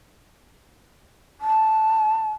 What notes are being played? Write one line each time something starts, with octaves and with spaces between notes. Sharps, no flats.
A5